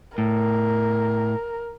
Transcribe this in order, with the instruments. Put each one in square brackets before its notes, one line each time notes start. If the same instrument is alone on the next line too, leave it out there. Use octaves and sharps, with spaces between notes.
[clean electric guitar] A2 [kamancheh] A#4